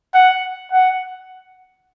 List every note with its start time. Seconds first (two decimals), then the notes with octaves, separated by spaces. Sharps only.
0.14 F#5
0.72 F#5